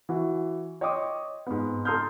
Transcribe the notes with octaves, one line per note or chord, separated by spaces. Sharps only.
E3 F#4
C#5 D#5 G5 C6 D6 D#6
G#2 B3
A4 A#5 C6 D#6 F6 G6